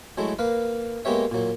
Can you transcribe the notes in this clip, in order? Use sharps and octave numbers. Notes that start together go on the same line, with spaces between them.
F#3 G#3 A3 E4
A#3 B4 F5
G#3 A#3 B3 G4 C#5 E5
A#2 F#3